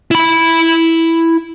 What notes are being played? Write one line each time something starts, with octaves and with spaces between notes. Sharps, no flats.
E4 B5